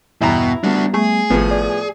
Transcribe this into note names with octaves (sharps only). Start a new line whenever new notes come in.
E2 G2 B2 E4 G5 A#5
G3 B3 D4 F#4
A3 G#4
G#1 A2 F3 B3
D5